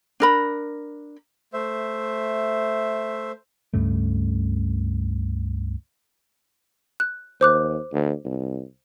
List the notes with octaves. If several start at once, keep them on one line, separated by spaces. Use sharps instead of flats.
D4 A#4 B5
A3 C5 E5
C#2 G2 C#3 A3
F#6
D#2 C5 D6 F#6
D2
C2